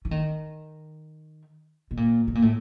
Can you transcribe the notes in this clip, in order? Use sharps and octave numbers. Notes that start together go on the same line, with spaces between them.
E3
D#3
B2
A#2
B2
A#2
A2